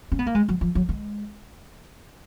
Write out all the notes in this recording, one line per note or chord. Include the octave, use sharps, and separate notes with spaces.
C#4
B3
A#3
G#3
F#3
F3
F#3
G#3